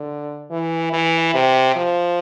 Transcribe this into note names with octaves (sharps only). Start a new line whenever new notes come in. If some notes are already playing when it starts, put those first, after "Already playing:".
Already playing: D3
E3
E3
C3
F3